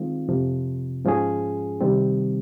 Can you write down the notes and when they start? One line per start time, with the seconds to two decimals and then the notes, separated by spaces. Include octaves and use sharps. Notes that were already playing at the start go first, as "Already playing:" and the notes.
Already playing: D#3 G#3 C4 F4
0.28 F2 C3 F3
1.05 G#2 F3 G#3 C#4 G#4
1.81 C3 D#3 G3 C4